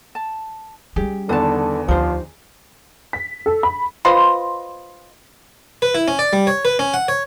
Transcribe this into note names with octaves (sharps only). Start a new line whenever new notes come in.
A5
G3 C#4 G4 G#4
E2 D3 D#3 B3 B4 A5
D2 F3 D4 D#4 G4 C5
B6
A4
B5
F4 B4 C5 D#5
B4
E4
C#4
D5
G3
C#5
B4
C#4
F#5
C#5